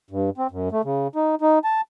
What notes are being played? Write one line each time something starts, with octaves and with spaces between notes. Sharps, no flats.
G2
C4
F#2
A3
C#3
D#4
D#4
A5